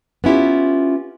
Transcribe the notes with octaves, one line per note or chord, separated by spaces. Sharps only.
B3 C#4 E4 F4 G4